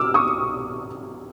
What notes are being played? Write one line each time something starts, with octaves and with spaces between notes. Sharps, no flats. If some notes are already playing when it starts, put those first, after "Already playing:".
Already playing: C2 B2 D6 E6 F6
C#6 D#6